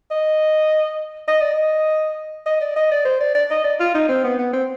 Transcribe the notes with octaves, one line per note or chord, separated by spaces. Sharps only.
D#5
D#5
D5
D#5
D#5
D5
D#5
D5
C5
D5
D5
D#5
D5
F4
D#4
C4
B3
B3
C4